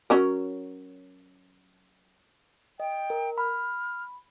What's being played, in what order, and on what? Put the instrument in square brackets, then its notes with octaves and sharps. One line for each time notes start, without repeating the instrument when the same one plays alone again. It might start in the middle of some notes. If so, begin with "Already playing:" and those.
[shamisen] F#3 C#4 A#4
[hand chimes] D#5 [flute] G5
[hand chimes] A#4
[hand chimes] B5 [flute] F6